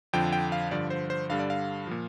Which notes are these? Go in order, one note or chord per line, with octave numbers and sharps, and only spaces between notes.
F2 D3 F3 G5
G5
F5
G2 D3 F3 D5
C5
C5
G2 D3 G3 F5
D5
F5
A#2 F3